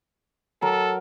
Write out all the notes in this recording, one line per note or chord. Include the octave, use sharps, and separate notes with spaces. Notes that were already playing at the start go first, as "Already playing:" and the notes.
F#3 A4 A#4